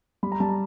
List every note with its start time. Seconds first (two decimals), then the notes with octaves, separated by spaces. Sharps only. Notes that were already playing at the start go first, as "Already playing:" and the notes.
0.23 G3 B5
0.32 A#5
0.40 G3 A5
0.49 A#5